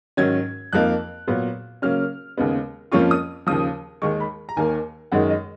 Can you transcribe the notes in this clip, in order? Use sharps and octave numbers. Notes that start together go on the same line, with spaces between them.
G#2 D#3 F#3 C#4 G#6
F2 F3 A#3 D#4 F#6
A#2 F#3 B3
C#3 F#3 A#3 C#4 F6
D#2 C#3 G#3 B3
F2 F3 A#3 C#4 F4 C#6
D#6
D#2 C#3 F3 D#6
D#2 D#3 G#3 C#6
B5
A#5
D#2 D#3 A#3 G#5
F#2 D#3 G#3 D#4 F#5
D#5